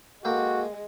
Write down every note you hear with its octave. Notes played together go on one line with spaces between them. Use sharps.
G#3 A#3 F#4 A4 G5